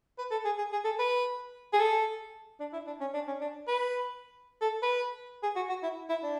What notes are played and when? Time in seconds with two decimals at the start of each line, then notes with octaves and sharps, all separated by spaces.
0.18 B4
0.31 A4
0.45 G#4
0.58 G#4
0.72 G#4
0.85 A4
0.99 B4
1.73 G#4
1.80 A4
2.60 D4
2.73 E4
2.87 D4
3.00 C#4
3.14 D4
3.27 C#4
3.41 D4
3.68 B4
4.62 A4
4.83 B4
5.43 G#4
5.56 F#4
5.69 F#4
5.83 E4
6.09 E4
6.24 D4